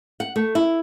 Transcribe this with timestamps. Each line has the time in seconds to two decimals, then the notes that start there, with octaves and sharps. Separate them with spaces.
0.20 F#5
0.36 A3
0.55 E4